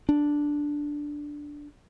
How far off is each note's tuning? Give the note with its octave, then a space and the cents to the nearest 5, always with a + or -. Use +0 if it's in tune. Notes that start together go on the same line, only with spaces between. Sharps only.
D4 +0